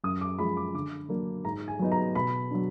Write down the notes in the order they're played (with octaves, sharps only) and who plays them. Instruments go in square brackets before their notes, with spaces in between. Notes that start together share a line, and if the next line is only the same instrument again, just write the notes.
[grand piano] F#2 D#6
D6
F3 G#3 B5
D6
D3 D6
F#3 A#3 D4
G#2 A#5
G#5
F#3 B3 D#4
A#5
B2 B5
F#3 D4